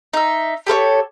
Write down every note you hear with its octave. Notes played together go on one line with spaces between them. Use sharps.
D#4 E5
G4 A4 B4 C#5